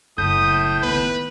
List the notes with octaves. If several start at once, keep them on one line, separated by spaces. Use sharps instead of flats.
F#1 A2 D#6 G6
D#3 B3 B4